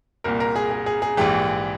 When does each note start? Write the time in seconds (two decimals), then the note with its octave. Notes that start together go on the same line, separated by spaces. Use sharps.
0.24 C2 A#2 A#4
0.40 A#4
0.56 G#4
0.71 G#4
0.86 G#4
1.02 G#4
1.17 A#1 G#2 E3 G4